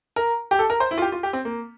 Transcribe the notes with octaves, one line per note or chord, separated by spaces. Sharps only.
A#4
G4
A4
A#4
C5
E4
F4
G4
F4
G4
C4
A#3